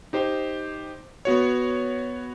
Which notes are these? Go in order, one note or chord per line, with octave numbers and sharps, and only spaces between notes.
D#4 G4 C5
B3 F#4 C#5